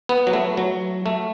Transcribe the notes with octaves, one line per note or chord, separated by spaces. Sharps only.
B3
F#3
A3
F#3
A3